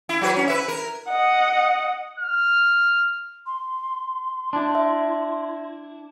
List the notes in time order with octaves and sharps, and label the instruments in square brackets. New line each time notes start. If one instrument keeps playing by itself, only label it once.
[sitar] E4
F#3 F#4 B4
C#4
B4 E5
A#4
[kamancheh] D#5 F#5
[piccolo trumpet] F6
[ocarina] C6
[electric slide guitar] D4 E4
[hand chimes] E5